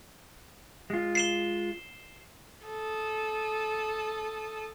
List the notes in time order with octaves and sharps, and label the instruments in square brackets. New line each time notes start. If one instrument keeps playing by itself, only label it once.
[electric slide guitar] G#3 F4
[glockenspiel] C7 E7 G7
[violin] A4 D#6